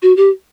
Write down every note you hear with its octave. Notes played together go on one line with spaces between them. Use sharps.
F#4
G4